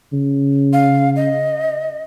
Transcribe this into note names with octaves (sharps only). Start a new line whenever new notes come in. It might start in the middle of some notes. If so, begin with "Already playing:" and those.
C#3
F5
D#5